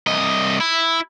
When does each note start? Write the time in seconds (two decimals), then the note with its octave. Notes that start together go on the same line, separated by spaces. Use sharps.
0.07 C2 D#5
0.60 E4